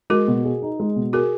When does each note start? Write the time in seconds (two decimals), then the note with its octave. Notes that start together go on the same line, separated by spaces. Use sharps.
0.10 G#3 F#4 A#4
0.28 B2
0.45 G#4
0.62 D#4
0.80 G#3
0.96 B2
1.13 F#4 G#4 A#4